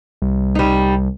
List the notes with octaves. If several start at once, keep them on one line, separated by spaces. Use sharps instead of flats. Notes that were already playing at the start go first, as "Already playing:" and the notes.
C2
G3 D#4